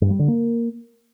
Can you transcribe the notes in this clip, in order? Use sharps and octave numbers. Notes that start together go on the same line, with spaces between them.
G2
G3
D3
A#3